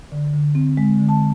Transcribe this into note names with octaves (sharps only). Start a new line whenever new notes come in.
D3
D3
C4
G#3
D3
A5